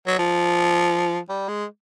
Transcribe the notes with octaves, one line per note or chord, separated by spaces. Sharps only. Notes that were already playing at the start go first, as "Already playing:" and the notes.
F#3
F3
G3
G#3